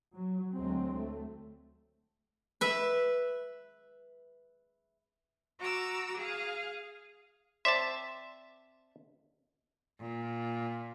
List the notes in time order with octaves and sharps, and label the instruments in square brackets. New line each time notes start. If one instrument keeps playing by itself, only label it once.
[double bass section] F#3
D2 F#3 G#3 C4
A3
[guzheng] B4 E5
[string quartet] F#4 A#5 D6 E6
G#4 F5
[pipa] C4 D5 C6 [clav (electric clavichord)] E5 A5
[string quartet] A#2